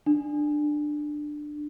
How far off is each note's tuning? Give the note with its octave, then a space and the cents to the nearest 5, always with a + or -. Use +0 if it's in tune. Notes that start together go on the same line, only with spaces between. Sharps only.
D4 +15